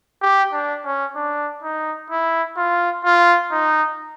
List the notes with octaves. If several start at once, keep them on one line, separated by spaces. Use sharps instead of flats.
G4
D4
C#4
D4
D#4
E4
F4
F4
D#4